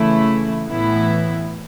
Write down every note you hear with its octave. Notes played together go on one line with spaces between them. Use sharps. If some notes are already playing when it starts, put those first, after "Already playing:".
Already playing: C#3 E3 A3 E4
A2 E3 B3 E4